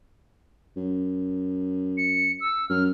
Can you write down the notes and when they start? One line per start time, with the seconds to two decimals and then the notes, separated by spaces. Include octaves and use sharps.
0.77 F#2
1.97 C#7
2.41 E6
2.69 F#2 F6